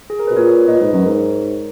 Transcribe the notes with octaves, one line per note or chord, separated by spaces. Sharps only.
G#4
A#4
B2 B4
A#2 A#4 C#5
A#2 B4 D#5
G#2
F#2
A#4 C#5
G#2